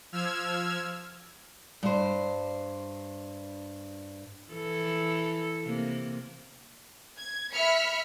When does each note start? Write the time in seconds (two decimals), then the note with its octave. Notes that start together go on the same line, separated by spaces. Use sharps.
0.12 F3 E6 F6 G#6
1.83 G2 C5
4.52 E3 A4
5.65 C3 A#3
7.16 G#6
7.53 E5 B5 F6 B6 C#7